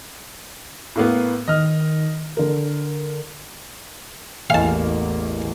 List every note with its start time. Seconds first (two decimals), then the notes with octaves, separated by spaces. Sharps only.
0.96 A2 A#3 B3
1.48 D#3 D#5 F6
2.37 D3 A#4
4.50 A1 E2 A#3 D#5 F5 G#5 A5